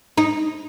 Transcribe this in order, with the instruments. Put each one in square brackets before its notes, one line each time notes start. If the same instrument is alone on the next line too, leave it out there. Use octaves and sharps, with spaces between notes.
[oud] D#4